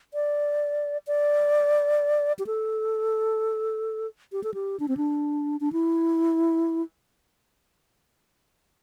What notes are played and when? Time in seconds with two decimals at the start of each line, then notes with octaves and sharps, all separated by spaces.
0.14 D5
1.07 D5
2.39 G4
2.47 A4
4.32 G4
4.44 A4
4.54 G4
4.80 D4
4.88 C4
4.97 D4
5.61 D4
5.72 E4